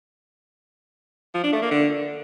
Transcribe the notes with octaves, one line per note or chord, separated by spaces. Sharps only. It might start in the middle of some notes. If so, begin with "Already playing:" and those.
F3
D4
A3
A#3
D3